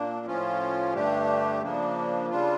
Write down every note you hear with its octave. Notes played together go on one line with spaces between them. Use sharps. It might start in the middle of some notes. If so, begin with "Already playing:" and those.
Already playing: A#2 A#3 D4
A2 F3 C#4 F4
G2 D3 A3 D4 G4
C#3 F3 A#3 D4
C#3 G3 D4 F4